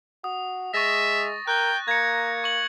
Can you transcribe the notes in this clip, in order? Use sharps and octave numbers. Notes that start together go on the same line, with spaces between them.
F#4 D#6
G#3 E5 C#6 A6 A#6
A#4 G5 F#6
A#3 A#5 G#6 C#7
C#6 F#7